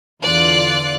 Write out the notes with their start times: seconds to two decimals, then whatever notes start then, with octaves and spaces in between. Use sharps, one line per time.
0.23 E2 D3 F4 D5 F#6